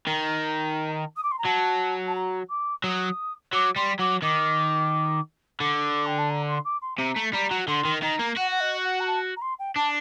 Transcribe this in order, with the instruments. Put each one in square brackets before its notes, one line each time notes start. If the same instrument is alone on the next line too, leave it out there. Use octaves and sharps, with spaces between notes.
[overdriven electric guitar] D#3 [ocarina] A#5
[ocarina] D#6
D6
C6
A#5
[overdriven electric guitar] F#3 [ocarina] A5
[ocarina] A5
A#5
D6
[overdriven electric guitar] F#3 [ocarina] D#6
[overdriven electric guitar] F#3 [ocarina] D6
[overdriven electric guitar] G3 [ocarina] C6
[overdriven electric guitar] F#3 [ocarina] D6
[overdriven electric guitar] D#3 [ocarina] D6
[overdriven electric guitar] D3 [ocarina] D6
[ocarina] G5
A5
A#5
C6
D6
C6
[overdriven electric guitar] C3 [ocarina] A#5
[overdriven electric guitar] A3
[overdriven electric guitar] G3 [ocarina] A#5
[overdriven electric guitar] F#3
[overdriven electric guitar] D3 [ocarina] C6
[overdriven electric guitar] D#3
[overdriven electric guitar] D#3 [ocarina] A#5
[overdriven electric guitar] A#3
[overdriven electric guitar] F#4 [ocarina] F#5
[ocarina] F#5
D#5
F#5
A#5
A5
A#5
C6
G5
[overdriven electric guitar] D4 [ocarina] A5